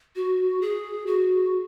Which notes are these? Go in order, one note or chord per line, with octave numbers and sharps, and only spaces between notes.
F#4
G#4
F#4